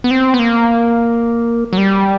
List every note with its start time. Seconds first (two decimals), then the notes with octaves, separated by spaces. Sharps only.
0.04 B3
0.11 C4
0.34 B3
0.39 A#3
1.73 F#3
1.78 G3